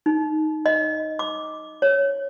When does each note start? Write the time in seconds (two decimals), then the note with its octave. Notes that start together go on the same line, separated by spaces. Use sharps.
0.06 D#4
0.66 D#5
1.19 D6
1.82 C#5